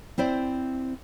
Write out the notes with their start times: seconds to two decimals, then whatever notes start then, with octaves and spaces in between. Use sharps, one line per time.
0.18 C4 E4 C5 D5